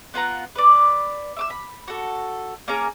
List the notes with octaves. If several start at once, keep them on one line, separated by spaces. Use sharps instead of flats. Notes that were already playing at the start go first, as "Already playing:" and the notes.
B3 F4 F#5 A#5
B4 D5
E5 D6 E6
B5
F#4 A4
A#3 C#4 G#4 A#5